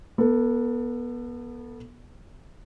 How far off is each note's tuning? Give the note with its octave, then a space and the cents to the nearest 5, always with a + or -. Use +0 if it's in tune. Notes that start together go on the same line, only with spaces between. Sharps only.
B3 -25 A4 +20